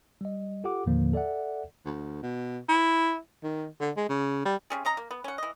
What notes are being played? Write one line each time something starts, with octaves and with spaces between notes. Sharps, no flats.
G3 D#5
F4 G4 A4 F#5 D6
D#2 A2 D3 F3 A#3
A4 D5 E5 F#5
D2
B2
E4
D#3
D3
G#3
C#3
G3
C3 C#4 G#4
C#4 D#5 A#5
A#3
B3
C#4 F#5
E3 D#5